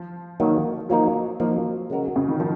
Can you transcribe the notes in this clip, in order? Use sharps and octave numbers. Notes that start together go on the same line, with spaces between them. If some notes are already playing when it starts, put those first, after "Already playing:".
Already playing: F3
D#3 F#3 A#3
F3 F#3 A#3 D#4 A#4
F3 A#3 D#4 A#4
C#3 G#3 C#4 F#4 A#4
C#3
D#3
F3 F#4 A#4